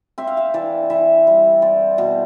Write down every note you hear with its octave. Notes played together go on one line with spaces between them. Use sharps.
C4 E5
F5
E5
E3 D5
E3 E5
G3
C4 D5
B2